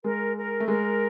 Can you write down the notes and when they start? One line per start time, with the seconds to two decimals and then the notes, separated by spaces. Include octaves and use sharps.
0.04 G#3 A#4
0.36 A#4
0.60 A3
0.67 G#3 A#4